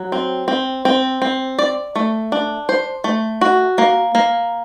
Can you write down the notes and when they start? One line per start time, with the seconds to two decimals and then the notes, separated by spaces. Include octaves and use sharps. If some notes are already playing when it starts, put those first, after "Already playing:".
Already playing: F#3
0.12 C4
0.48 C4
0.85 C4
1.22 C4
1.59 D5
1.96 A3
2.32 D4
2.69 C5
3.04 A3
3.41 F#4
3.78 A#3
4.15 A#3